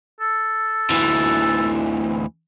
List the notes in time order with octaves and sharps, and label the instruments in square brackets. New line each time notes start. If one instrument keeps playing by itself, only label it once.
[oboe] A4
[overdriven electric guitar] D2 E3